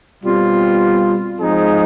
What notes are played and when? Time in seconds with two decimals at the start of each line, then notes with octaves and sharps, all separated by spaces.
0.23 B2 G3 C4 F4
1.39 F3 G#3 C4 D#4 G#4